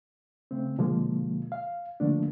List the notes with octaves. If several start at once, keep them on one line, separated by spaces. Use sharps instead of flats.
C#3 A3 C4
B2 D3 F3 G#3 A#3
F5
D3 F3 A3 A#3 D4